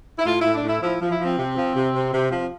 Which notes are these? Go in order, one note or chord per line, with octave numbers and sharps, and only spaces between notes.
E4
A2 F4
E4
A2
D4
A2 E4
F3 E4
F3
E4
F3
C4
C3
F3
C3
C3
C3
F3